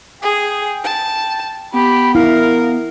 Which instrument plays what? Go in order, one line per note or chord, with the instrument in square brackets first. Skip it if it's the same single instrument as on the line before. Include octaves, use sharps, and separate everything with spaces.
[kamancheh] G#4 [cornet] G5
[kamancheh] A5
[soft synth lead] B3 [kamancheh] G4 [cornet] B5
[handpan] E4 [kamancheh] A#4 [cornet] F5